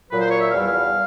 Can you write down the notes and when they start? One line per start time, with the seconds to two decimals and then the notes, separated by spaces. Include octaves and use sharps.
0.11 A#2 F#3 B4
0.21 C5
0.31 C#5
0.41 E5
0.51 E2 B2 G3 F5